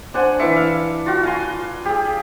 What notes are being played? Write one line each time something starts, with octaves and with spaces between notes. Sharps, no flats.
D4 C5 F#5 G#5 C6
E3 B4 E5 D6 C#7
F5
F4 F#4
F5 G#5 C6
G4 G#4